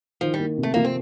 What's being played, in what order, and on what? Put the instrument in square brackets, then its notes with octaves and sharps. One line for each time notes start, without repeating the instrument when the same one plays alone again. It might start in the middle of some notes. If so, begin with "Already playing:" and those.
[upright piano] D#3 [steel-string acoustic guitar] F3
[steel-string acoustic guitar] G3
[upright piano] A#3
C3
[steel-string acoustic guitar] A3
[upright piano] F3 [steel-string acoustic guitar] A#3
[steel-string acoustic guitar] C4